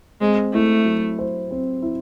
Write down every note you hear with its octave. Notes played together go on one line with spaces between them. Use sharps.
G#3 C4
A3 E4
F#3
C5
C4
E4